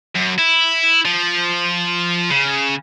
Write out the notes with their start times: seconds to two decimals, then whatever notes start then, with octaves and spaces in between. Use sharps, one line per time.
0.15 F#2
0.38 E4
1.05 F3
2.31 C#3